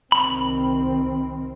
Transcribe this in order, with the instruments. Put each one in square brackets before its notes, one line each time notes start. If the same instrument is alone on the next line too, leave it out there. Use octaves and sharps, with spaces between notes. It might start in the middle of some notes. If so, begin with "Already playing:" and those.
[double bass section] C2 D#3 C4 [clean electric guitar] B5